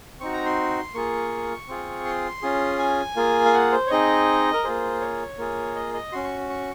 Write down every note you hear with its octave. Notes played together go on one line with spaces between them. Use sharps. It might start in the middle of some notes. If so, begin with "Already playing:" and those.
C4 D#4 F#4 C#6
A#5
C6
A#3 F4 G#4 C#6
C4 F4 G#4
C6
C#4 F4 G#4
G#5
A#3 F4 G#4
F5
F#5
C5
C#5
C4 D#4 G#4 D#5
A#4
A#3 F4 G#4 C5
C#5
A#3 F4 G#4
D#5
D#5
C#4 F#4 C6
C#6
C#6